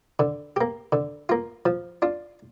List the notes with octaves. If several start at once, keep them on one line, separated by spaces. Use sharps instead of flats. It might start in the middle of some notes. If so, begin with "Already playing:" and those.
D3
A#3 G4
D3
A#3 F4
F3
D4 F4